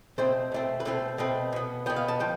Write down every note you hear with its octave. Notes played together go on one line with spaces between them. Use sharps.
B2 A3 C4 C5
B2 A3 C4
B4
B2 A3 C4 A4
B2 A3 C4 B4
B2 B3
B2 B3 G5
F5
A5
F3 G5